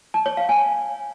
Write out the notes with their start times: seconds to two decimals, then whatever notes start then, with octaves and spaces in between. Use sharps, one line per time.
0.14 A5
0.26 C#5
0.37 F5
0.49 G#5